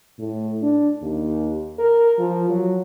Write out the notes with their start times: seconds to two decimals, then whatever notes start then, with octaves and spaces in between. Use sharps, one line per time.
0.19 A2
0.62 D4
1.02 D#2
1.79 A#4
2.19 F3
2.50 F#3